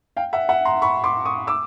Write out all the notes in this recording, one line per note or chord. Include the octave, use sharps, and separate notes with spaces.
F5 G5
E5 F#5
E5 F#5
A#5 C6
B5 C#6
C6 D6
C#6 D#6
D6 E6